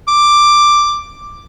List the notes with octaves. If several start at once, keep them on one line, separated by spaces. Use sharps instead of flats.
D6